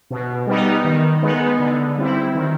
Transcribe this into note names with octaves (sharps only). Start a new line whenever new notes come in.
B2
G3 B3 D#4
D#3
G#3 B3 D#4
D3
G3 C4 E4
D#3